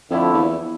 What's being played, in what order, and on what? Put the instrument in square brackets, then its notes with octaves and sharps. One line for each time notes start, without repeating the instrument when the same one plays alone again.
[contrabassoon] F2 [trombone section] D3 F3 A3 E4
[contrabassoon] E2